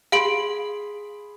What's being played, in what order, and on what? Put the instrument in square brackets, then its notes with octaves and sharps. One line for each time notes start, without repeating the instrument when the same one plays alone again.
[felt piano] G#4 B5 C6 [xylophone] F5 D7 F#7